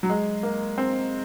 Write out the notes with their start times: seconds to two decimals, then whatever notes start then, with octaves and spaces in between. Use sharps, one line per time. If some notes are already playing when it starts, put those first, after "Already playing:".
0.03 F#3
0.10 G#3
0.43 A#3
0.78 C4